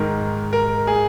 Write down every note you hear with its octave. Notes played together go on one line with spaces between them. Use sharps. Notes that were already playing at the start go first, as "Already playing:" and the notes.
Already playing: G#2 D#3 A#4
A#4
G#4